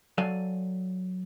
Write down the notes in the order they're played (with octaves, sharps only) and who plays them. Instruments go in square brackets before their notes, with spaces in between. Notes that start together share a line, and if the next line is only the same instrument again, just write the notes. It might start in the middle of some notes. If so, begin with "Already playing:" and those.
[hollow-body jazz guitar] F#3 A4 D5 F5 G#5